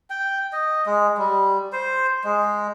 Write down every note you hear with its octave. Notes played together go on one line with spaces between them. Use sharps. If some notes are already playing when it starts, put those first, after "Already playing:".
G5
D#5
G#3
G3
C5
G#3